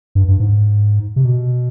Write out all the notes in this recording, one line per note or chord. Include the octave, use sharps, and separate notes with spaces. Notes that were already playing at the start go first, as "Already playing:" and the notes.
G2
G2
G#2
C3
B2